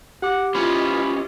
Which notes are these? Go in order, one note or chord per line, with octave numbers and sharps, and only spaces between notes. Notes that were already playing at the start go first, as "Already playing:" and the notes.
G4 F#5 D6
E3 C#4 F4 C5 D#5 B5